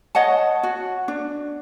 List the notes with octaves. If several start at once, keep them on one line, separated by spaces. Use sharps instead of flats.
C#5 D#5 F#5 A5
F#4
D4